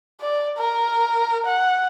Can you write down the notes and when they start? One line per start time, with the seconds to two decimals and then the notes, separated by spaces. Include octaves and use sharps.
0.21 D5
0.57 A#4
1.46 F#5